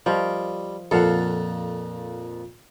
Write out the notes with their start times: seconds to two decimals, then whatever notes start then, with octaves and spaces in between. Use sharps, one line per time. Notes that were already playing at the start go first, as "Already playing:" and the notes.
0.06 F3 G3 A#4 D#5
0.91 F2 A#2 F3 A4 F5 F#5